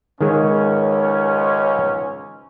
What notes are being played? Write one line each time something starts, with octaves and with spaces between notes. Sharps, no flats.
C#2 G#2 D#3 G#3 C#4